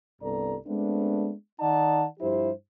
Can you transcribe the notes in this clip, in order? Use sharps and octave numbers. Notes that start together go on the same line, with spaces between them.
C2 G2 B3 A4 D5 A#5
G#3 A3 B3 C4 D4
D#3 D#4 D5 F#5 A5
G2 F3 E4 G4 C5